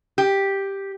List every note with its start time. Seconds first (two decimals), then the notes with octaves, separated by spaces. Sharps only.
0.18 G4